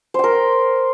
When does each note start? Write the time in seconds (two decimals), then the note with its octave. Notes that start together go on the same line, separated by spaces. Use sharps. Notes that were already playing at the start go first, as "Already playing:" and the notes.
0.14 C5
0.19 G5
0.24 A#4